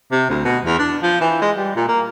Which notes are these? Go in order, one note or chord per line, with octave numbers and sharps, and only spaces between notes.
C3
D2
B2
E2
D4
F3
E3
G#3
G3
A#2
A#3